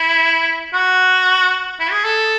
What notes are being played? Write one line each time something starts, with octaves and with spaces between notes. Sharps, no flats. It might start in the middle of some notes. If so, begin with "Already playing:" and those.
Already playing: E4
F#4
E4
G#4
A4